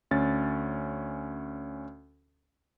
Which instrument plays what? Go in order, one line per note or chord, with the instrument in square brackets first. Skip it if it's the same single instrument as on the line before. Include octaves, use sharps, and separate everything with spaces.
[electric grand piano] D2 C#4 A6